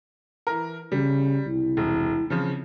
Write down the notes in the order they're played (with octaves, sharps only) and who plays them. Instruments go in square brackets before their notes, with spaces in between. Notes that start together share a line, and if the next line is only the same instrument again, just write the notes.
[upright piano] E3 A#4
[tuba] C#3 [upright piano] G3
[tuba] C2 [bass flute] E4
[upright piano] E1
[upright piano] C#3 F3 [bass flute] C4